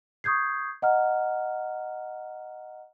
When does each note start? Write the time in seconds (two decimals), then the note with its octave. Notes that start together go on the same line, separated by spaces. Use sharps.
0.24 C#6 D#6 G6 G#6 C7
0.82 D#5 F#5 A#5 F6